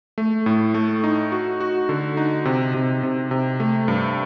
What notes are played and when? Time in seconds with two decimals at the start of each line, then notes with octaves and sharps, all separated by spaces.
0.18 A3
0.46 A2
0.74 A3
1.04 D#4
1.32 F#4
1.60 F#4
1.89 D3
2.17 D#4
2.45 C3
2.74 C3
3.03 C3
3.31 C3
3.60 A3
3.88 G2